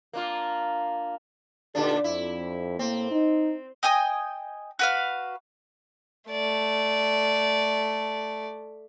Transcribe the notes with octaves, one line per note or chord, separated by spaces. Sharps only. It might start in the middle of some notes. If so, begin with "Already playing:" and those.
A#3 D4 F4
A#2 D3 D4 D#4 G4 A4
F2 E4
A2 A#3 C4
D#4
D#5 G5 G#5 D#6
F#4 B4 F5
A3 D5